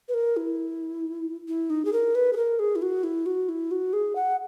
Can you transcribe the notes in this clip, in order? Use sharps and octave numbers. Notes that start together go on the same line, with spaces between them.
B4
A#4
E4
E4
D#4
G#4
A#4
B4
G#4
A#4
G#4
E4
F#4
E4
F#4
E4
F#4
G#4
F#5